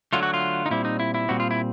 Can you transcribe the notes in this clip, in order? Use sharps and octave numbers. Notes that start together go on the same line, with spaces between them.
D3 F#3 A3 F4
F#4
F4
D#4
A#2 G3 C4 E4
D#4
E4
E4
A#2 G3 C4 F#4
F4
E4